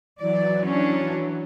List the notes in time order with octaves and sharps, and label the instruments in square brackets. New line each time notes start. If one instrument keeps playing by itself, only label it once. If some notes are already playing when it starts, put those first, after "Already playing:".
[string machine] E3 F#3 [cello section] D5
[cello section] C#4 D4